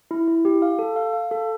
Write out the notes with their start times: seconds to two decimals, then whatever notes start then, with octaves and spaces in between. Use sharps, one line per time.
0.11 E4
0.28 E4
0.45 G4
0.62 F5
0.79 A4
0.96 F5
1.13 F5
1.31 A4